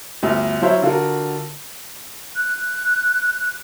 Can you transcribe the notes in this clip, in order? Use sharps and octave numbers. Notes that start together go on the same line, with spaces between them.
G1 D2
F#3 E4 F4 C5 C#5 E5
D3 F4 F#4 A#4
F#6